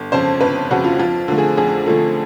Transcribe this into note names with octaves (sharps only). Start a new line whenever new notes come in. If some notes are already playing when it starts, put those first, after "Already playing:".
Already playing: G1
F2 C#3 C5
G1 B4
F2 C#3 F#4
F4
F2 F4
D3 F3 A3
G#4
F2 G#4
D3 F3 A3